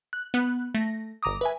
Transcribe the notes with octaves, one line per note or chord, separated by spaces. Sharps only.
F#6
B3 F#6
A3 A#6
G1 A#5 D6 D#6
B4 E5 G#5